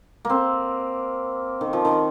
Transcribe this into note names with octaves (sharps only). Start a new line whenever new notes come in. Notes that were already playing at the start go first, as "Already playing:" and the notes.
A#3 C4
D#3
F3
D#3